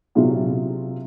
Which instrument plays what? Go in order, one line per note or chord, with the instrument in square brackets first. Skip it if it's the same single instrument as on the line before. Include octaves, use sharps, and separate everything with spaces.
[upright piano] C3 F#3 D4 E4 F4 G#4